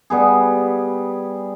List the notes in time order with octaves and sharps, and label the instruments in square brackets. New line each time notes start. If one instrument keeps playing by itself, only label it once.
[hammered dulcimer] G3 B3 G#4